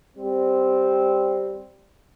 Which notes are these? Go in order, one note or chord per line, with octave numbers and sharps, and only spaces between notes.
G3 C4